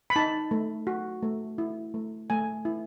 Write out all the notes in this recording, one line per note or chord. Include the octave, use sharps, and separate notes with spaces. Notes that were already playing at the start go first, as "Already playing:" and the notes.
B5
D#4 A5
A3
F#4
A3
E4
A3
A3 G#5
E4